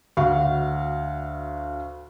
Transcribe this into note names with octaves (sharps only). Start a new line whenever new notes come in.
D2 F#4 F5